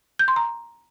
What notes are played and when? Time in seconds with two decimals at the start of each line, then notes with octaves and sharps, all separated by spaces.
0.19 G6
0.28 C6
0.36 A#5